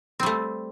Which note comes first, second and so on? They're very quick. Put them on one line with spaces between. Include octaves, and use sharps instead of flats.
C4 G3 A3